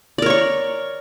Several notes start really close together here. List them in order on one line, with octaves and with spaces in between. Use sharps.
D5 A#4 C#5 C#6